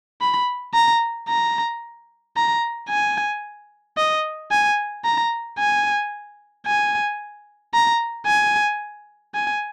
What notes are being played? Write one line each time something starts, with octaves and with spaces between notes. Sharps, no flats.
B5
A#5
A#5
A#5
G#5
D#5
G#5
A#5
G#5
G#5
A#5
G#5
G#5